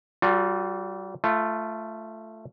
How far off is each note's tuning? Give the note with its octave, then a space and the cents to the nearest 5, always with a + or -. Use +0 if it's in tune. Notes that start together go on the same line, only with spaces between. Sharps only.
G3 -30 F4 +35 A4 +0
A3 +0 F4 -20